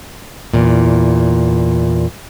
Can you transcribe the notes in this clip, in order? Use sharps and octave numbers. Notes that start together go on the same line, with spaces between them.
E2 A#2